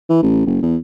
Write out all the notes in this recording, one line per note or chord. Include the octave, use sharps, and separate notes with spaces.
E3
A1
F#1
E2